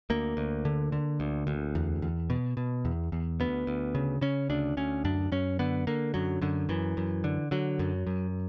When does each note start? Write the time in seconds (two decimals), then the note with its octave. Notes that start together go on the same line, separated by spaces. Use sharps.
0.10 D2 A#3
0.37 D2
0.65 D3
0.92 D3
1.20 D2
1.47 D2
1.75 E2
2.02 E2
2.30 B2
2.57 B2
2.85 E2
3.12 E2
3.40 D2 B3
3.67 D2
3.95 C#3
4.21 C#3 C#4
4.50 D2 D4
4.77 D2 C#4
5.04 F#2 D4
5.32 F#2 C#4
5.59 D3 B3
5.87 D3 A#3
6.14 F#2 F#3
6.42 F#2 D3
6.69 F#2 E3
6.97 F#2
7.24 D3
7.51 D3 F#3
7.79 F#2
8.07 F#2